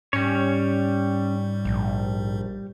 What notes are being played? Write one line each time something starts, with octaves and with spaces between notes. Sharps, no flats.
G#2 G3 C#4 C#5
A#1